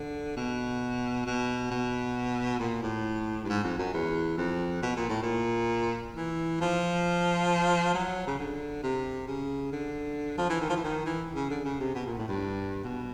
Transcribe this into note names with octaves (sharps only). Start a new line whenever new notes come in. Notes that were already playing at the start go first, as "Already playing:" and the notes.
Already playing: D3
B2
B2
B2
A#2
A2
G2
G#2
F2
F#2
E2
F2
B2
A#2
A2
A#2
E3
F3
F#3
C#3
D3
C3
C#3
D3
F3
E3
D#3
F3
E3
D#3
E3
C#3
D3
C#3
C3
B2
A#2
A2
G2
B2